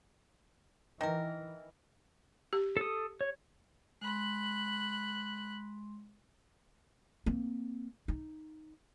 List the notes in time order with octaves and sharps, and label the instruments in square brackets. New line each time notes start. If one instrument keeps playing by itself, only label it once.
[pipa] D#3 A#4 [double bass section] E3
[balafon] G4
[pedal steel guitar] A4 D#6
C#5
[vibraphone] G#3 C6 [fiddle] B5 F#6
[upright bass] A#3 C4
D#4